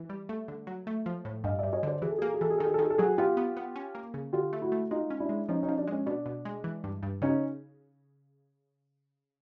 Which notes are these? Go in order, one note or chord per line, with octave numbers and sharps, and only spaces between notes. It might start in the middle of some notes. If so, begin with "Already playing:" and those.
Already playing: E3
G3
A3
D3
F#3
A3
F3
A2
G2 D#5 F5
G2 D5 E5
C#5 D#5
D3 C5 D5
E3 G#4
A4
G#4
A#3 A4
G#4
E3 A4
G#4
D#3 A4
G#4
A4
D#3 G#4
A4
F#3 F#4 G#4
B3 F4 G4
B3
B3
C#4
A#3
C#3
D3 F4 G4
A3
E4 F#4
A3
G#3 D#4 F4
C#4
D4 E4
G#3
F3 C#4 D#4
C#4 D#4
F3
D4
G#3 C#4
B2 D4
B2
G#3
E3
G2
G2
C#3 C#4 D#4